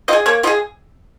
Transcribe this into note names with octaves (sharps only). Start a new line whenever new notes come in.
F4 D#5
G#4
A#3 C#5
F4 D#5
G#4